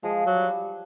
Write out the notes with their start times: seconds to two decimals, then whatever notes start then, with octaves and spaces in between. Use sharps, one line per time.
0.03 F3 G#3
0.27 F#3
0.34 G3